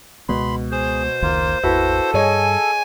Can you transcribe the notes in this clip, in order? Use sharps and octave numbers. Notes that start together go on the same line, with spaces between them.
C#2 B2 G#3 B3 B5 C6
G#4 C5
F1 C#2 D#3 A#3 F4
G#1 E2 E4 F#4 A4 B4
G2 G3 G#4 C#5 D#5 G#5